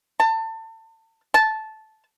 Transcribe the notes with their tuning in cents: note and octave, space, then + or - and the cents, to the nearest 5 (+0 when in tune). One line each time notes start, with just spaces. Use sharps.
A5 +30
A5 -10